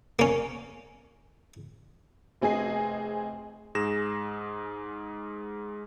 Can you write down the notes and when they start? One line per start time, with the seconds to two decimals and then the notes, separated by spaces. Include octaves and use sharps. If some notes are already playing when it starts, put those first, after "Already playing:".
0.19 A#3 C#4
2.41 F1 C4 G#4 D#5 G#5 C7
3.75 G#2 G#4 A#6 E7